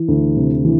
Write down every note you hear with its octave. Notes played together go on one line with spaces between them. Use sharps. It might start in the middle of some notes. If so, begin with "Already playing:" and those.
Already playing: E3
D2
C3
E3